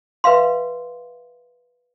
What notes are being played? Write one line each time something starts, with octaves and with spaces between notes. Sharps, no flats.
B4 E5 F5 C6